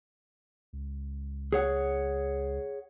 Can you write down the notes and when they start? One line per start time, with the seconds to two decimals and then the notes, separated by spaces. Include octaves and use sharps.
0.73 C#2
1.52 G#4 C#5 F#5